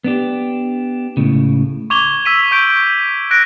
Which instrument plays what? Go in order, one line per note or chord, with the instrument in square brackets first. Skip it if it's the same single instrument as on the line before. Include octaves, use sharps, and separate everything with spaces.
[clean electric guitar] B3 D4 G4
C#2 A2 C#3
[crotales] C#6 D6 G#6 F7 G7
E6 B6 D#7
C#6 G6 D7
F#6 A#6 D7